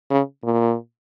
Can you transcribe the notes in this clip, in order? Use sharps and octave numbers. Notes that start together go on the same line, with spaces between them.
C#3
A#2